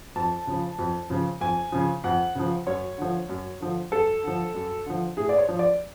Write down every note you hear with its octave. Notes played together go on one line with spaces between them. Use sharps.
F2 A5
C#3 F3
F2
C#3 F3
F2 G#5
C#3 F3
F2 F#5
C#3 F3
F#2 C#5
D3 F3
F#2
D3 F3
F#2 A4
D3 F3
F#2
D3 F3
A2 G#4
D5
C#5
F3
D5